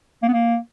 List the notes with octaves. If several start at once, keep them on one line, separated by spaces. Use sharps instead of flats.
A#3
B3
A#3